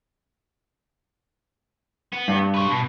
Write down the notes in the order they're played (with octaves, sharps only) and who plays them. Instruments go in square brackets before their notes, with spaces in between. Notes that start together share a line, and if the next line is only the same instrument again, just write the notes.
[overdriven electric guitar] B3
[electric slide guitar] G2
[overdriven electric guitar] B4 C#5
B2